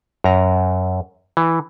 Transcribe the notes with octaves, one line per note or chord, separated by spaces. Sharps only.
F#2 A#5
E3